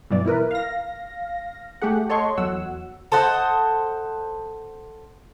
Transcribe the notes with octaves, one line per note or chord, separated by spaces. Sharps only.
G2 B2 E3 F#3 D5
B2 E4 A#4 B4
F5 A#6
A3 G4 G#4 F#5
A4 C#5 D#5 C6 C#6
E2 F#3 F#5 E6
A4 C5 D#5 F#5